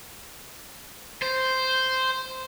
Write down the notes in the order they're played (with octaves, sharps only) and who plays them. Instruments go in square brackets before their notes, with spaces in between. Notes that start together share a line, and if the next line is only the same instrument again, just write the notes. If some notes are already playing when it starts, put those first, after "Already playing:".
[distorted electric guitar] C5